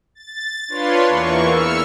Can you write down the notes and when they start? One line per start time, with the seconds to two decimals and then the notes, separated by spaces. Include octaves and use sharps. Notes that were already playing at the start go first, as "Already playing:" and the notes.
0.15 A6
0.68 D4 F4 B4 C#5 C6
1.08 E2 E3 A#3 C#6
1.47 E6 F6 C#7